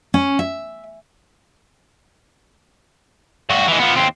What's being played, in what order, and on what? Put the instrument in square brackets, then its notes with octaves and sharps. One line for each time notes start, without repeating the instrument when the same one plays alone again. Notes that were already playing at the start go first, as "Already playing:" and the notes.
[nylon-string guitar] C#4
E5
[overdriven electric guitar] G2 F#4
E3 G#3
F3 B3
D#2 C4